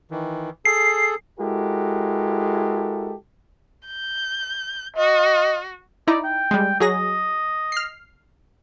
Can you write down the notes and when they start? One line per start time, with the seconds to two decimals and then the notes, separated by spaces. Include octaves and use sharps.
0.11 D#3 E3
0.65 G#4 A4 C7
1.39 G#3 E4 F#4 G4 A4 A#4
3.86 G6
4.96 F#4 D#5
6.07 D#4 E4 D5 A#5
6.24 G5
6.51 G3 G#3
6.80 F#3 G#4 D#5 A#6
7.72 F6 C7